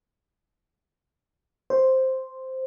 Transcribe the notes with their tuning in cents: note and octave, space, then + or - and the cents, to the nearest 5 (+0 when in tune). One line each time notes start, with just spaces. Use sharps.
C5 +0